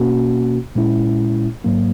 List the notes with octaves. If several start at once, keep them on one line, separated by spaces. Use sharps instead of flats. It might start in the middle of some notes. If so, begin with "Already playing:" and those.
Already playing: B2 A#3 C#4 F#4
A#2 G#3 C#4 E4
G#2 F#3 A#3